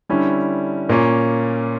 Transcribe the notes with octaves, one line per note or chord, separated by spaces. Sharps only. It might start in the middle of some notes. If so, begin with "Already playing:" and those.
D3 G3 C#4 E4
A#2 A#3 C#4